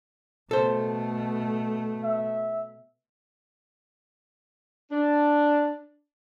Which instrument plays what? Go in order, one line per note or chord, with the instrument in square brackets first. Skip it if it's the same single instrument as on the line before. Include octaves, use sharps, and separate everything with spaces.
[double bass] B2 A3 [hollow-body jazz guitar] A4 C5
[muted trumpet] E5
[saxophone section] D4